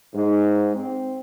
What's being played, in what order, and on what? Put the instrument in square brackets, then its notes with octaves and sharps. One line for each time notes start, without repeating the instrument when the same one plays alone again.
[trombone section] G#2
C4